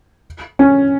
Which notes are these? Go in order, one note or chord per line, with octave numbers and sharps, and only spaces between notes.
C#4